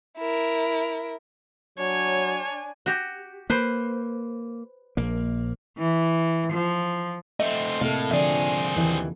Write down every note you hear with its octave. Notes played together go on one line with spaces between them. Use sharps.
E4 A#4
F#3 D4 C#5 G#5
F#4 G4
A#3 B4 C5
A#1 A#3
E3
F3
A3 C4 D#5 E5
A2 C3 A#3 A4 F5
D3 F3 C4 G#4 D5 E5
D#2 E3